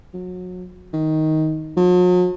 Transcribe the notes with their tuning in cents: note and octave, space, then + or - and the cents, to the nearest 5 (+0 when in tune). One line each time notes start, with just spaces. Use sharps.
F#3 -30
D#3 +10
F#3 -45